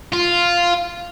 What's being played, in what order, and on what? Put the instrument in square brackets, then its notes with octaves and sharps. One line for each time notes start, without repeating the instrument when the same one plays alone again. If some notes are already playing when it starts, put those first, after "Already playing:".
[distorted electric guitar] F4